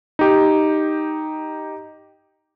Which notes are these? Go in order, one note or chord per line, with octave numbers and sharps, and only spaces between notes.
D#4 G4